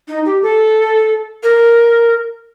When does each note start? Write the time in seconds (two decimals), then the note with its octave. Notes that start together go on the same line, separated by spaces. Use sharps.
0.08 D#4
0.26 G4
0.43 A4
1.43 A#4